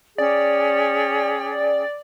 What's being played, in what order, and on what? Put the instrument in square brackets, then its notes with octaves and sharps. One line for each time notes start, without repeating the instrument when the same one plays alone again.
[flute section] C#4 G#4 G5 [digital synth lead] D5